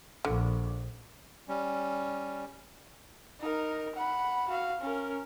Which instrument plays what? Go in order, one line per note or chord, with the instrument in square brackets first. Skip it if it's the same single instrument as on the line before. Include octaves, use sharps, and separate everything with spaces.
[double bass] A#1 [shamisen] D3
[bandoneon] G3 C#4
[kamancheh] D#4 A#4
F#5 B5
F#4 F5
C#4 A#4